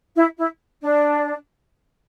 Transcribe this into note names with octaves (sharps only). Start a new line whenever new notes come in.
E4
E4
D4